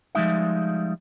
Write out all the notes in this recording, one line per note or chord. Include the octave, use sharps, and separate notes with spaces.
F3 G3 G#3 D#4 E5